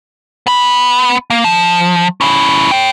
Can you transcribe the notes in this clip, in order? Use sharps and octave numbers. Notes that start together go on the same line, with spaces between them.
B3 B5
A#3
F3
C#4 E4
C#5 G5